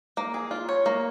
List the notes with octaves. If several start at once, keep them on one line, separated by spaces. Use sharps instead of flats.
A#3
G#4
F4
C#5
A#3